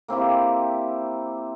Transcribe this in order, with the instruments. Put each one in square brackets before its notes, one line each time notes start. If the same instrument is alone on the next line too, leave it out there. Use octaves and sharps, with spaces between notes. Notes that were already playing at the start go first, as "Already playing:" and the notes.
[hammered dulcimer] A#3 C4 E4 G4